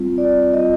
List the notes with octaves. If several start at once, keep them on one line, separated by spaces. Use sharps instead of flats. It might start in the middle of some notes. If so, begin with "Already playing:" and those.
Already playing: G3 C4 F4
D5
G3 C4 F4 D#5